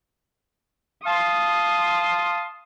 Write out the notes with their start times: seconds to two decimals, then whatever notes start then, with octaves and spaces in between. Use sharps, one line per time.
1.05 F5 A5 C6 D#6